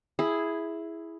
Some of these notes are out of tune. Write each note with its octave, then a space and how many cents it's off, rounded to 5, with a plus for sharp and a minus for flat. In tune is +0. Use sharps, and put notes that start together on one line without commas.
E4 +0 G#4 +0